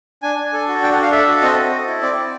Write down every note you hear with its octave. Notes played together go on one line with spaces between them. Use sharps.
D4 G#5
D4
A4
F#4
D4 G5
F#5
D4 F5
A4 E5
F#4
C4 D#5
C4
A4
E4
C4 D5
C4